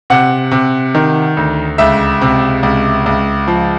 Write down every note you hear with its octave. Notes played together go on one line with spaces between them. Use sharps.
C3 F#5
C3
D#3
D2
C#2 E5
C3
C#2
C#2
F3